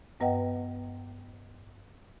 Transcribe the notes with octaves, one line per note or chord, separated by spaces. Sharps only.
G2 B3 B4 D#5 F#5 G5